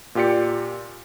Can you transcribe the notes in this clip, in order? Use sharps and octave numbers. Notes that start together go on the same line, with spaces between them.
A#2 F4 G4 D5 C#7